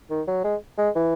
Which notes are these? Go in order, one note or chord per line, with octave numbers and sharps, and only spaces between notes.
D#3
F#3
G#3
G#3
E3